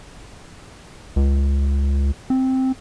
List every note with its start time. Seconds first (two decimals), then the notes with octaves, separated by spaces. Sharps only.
1.16 C#2
2.30 C4